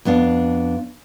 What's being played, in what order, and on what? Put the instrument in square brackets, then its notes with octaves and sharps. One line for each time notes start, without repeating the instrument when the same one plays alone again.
[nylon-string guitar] F2 B3 D4 F5